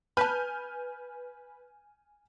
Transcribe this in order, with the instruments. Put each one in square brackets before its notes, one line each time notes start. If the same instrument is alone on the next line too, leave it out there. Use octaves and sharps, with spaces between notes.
[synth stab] B4 [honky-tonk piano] G#5 F6 G6 [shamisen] A5 B5